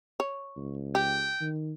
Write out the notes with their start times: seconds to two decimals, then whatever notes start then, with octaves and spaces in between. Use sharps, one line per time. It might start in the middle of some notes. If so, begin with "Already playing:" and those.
0.20 C#5
0.57 C#2
0.95 G4 G5
1.41 D#3